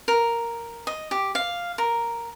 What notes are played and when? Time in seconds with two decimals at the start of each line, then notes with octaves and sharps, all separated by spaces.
0.08 A#4
0.87 D#5
1.11 G4
1.35 F5
1.78 A#4